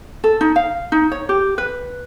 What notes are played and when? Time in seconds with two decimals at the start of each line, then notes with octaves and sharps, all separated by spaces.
0.24 A4
0.41 D#4
0.56 F5
0.92 D#4
1.12 C#5
1.29 G4
1.58 B4